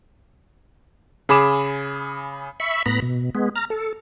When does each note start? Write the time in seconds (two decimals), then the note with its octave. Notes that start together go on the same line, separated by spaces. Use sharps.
1.29 C#3 G#4 B5 D6 E7
2.60 E5 B5 C#6
2.86 A2 B3 A#5 B5
3.02 B2
3.35 G#3 B3
3.56 A#5 F6
3.70 A4